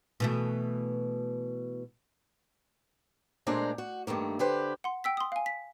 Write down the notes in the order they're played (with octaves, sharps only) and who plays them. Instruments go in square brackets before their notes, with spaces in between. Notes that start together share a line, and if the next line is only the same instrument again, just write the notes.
[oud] B2 E3 A3
[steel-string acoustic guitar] A#2 G#3 A3 D4 C5 A#5
F#4
G2 D#3 A3 A#3
D3 G4 B4 C5
[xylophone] F#5 C6
G5 E6 B6
C6 D#6
F5 G#5
B6